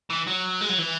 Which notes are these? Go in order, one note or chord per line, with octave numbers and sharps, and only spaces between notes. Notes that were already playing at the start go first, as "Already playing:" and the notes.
E3
F#3
G#3
F#3
E3